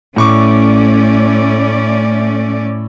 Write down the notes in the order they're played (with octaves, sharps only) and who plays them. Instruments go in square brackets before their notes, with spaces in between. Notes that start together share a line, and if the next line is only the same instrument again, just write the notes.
[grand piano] A2 C#6 D6 [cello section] A3 C#4 D5